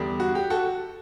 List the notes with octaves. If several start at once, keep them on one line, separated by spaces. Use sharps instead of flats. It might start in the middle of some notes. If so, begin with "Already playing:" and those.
Already playing: E2 D3 G3 D4
F#4
G4
F#4 A4